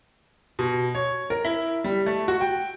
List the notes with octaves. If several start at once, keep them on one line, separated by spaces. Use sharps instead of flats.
B2
C#5
A#4
E4
G3
A3
F#4
G5